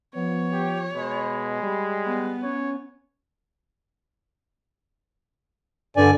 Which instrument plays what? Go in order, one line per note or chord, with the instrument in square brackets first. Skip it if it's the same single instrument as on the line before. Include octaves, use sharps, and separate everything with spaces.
[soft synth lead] F3 [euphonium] B3 [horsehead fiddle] C#5
[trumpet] G4
[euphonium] B2 [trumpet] G#3 [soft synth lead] B5
[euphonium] G3
[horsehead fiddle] B3
[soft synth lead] C#4 [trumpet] C#5
[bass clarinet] G2 [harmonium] D3 D5 G#5